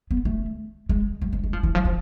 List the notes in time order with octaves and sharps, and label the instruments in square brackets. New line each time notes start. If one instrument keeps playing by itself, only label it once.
[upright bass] B3
A3
G#3
F3
G#3
G#3
F3
E3
F3
F3